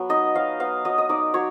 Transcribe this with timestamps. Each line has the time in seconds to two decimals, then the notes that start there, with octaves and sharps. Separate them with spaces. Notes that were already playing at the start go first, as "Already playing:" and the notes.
Already playing: F#3 B3
0.09 D#4 D#5
0.35 F#3 F5
0.60 B3 F5
0.85 F#3 D#5
0.98 D#5
1.09 D#4 D5
1.34 F#3 C#5